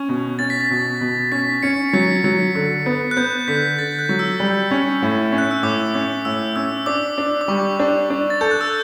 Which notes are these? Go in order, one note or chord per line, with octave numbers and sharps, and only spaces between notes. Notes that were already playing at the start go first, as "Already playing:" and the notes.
Already playing: C#4
B2
C#4 A6
B6
A6
B2
B2
C#4 B6
C#4 C#7
F#3 B6
F#3
D3
B3
F#6
B3 G6
D3 B6
D3 A6
F#6
F#3
E6
G3
C#4
A2
C#4
F#6
E6
A2 D6
C#4 D6
A2 E6
C#4 E6
D4 D6
D4
D6
G3 C#6
D4
D4
A6
A4 G6
F#6
E6